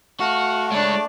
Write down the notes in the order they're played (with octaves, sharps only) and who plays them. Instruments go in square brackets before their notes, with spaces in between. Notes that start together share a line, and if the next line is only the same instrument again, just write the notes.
[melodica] A3 [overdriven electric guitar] F#4 [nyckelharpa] F5
[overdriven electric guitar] G#3 C#5 [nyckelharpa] D4 D5